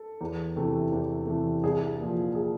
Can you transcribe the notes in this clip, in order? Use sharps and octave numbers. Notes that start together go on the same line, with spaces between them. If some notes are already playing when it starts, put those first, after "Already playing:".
Already playing: A4
E2
C3 E3 A3
E2
C3 E3 A3
C2 G#4
A#2 F3
G#4